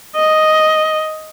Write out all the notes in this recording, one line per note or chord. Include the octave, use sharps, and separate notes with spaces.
D#5